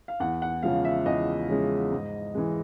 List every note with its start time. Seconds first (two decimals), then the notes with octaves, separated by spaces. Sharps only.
0.08 F5
0.20 E2 F#5
0.42 F#5
0.63 C#3 F3 G#3 F5
0.85 E5
1.06 E2 D#5
1.49 C#3 F3 G#3
1.92 G#2
2.35 E3 G#3